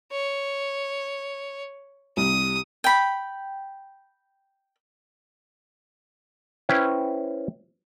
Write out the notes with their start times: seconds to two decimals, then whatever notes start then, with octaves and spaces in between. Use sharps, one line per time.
0.12 C#5
2.17 C2 G3 D#6
2.84 G5 B5
6.69 C#4 E4 B4 C5 G5